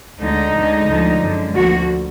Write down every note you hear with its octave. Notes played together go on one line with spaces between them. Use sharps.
D2 D3 G#3 D#4
D2 D3 G#3
D2 D3 F3 G#3
F#2 D3 G#3
D2 D3 F3 A#3 F#4